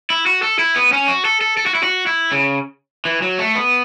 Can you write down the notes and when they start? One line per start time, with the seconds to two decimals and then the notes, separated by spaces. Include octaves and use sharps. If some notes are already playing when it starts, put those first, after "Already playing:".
0.10 E4
0.26 F#4
0.43 A4
0.59 E4
0.76 B3
0.93 C#4
1.08 F#4
1.25 A4
1.41 A4
1.57 A4
1.66 F#4
1.75 E4
1.83 F#4
2.07 E4
2.32 C#3
3.05 E3
3.22 F#3
3.39 A3
3.55 B3